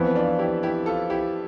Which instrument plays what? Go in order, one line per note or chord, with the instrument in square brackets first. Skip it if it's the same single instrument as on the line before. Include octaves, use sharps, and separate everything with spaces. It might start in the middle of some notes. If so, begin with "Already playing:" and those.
Already playing: [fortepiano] F2 E3 B3 [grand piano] C4 E4
[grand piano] D4 F4
E4 G4
E4 G4
F4 A4
E4 G4